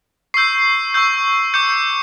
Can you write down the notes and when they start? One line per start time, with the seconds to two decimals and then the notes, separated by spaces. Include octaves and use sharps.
0.34 C#6 E6 G6 C7
0.94 C#6 E6 G6
1.54 D6 G6 C#7